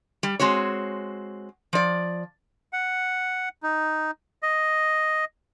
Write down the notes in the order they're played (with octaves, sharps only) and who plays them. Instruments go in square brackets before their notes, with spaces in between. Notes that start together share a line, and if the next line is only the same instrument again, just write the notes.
[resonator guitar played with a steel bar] G3
G#3 C4 F#4 C#5
F3 D5
[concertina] F#5
D#4
D#5